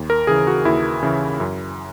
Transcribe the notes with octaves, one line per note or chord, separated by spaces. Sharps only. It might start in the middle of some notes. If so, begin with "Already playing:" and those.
Already playing: D#2
A#4
C#3 E3 G#4
F#4
D#2 E4
C#3 E3
F#2